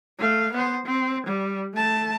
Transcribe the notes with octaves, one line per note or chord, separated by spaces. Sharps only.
A3 F5
B3 C5
C4
G3
A3 A5